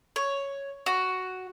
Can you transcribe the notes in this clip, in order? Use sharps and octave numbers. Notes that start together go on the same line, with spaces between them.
C#5
F#4